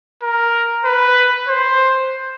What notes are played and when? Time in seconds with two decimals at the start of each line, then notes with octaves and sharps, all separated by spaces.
0.22 A#4
0.85 B4
1.48 C5